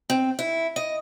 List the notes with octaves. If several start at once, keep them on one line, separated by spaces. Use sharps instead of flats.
C4
E4
D#5